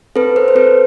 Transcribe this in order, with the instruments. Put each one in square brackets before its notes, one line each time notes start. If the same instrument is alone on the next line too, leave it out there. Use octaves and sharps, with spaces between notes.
[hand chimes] C4 A4 B4
A4 A#4 C5
C5
C4 A4 B4